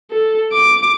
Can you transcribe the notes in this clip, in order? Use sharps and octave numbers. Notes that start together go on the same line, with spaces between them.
A4
D6